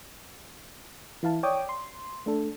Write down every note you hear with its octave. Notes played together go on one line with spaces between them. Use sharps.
E3 E4 F5 A5
C#5 D5 G5 D6 D#6
C6
A3 D4 A4